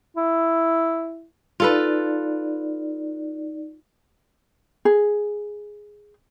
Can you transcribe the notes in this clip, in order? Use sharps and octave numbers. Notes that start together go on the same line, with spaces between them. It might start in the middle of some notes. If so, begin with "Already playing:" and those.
E4
D#4 F4 A4 B4 D5
G#4